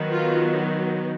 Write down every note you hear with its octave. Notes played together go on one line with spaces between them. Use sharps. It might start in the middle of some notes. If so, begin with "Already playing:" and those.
Already playing: D#3 F#3 B3
F4